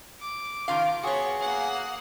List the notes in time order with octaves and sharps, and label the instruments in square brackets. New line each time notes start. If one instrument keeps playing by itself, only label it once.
[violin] D6
[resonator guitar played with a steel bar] D#3 F4 F5
[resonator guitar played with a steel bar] B3 F#4 [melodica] G#4 [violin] C#5 C#6
[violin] A#3 F#5